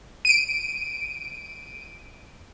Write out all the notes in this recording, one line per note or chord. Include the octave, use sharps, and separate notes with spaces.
D7 D#7